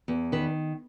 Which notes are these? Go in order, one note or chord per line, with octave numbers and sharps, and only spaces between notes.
E2
D#3 B4